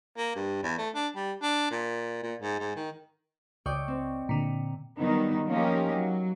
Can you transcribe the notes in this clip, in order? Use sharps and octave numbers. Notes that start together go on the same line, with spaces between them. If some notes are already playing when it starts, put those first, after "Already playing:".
A#3
G2
E2
A3
D4
G3
D4
A#2
A#2
G#2
G#2
D#3
C#2 D5 D#5 G5 C#6
C4
A#2 D3
D#3 F#3 G3 B3 D#4
F3 A#3 C#4 D#4 G4 A#4
F#3